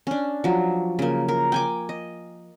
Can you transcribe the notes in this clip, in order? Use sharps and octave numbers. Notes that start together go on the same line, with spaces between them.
C#4 D4
F3 F#3
C#3 A#3
A#4
G5 G#5 D6
D#5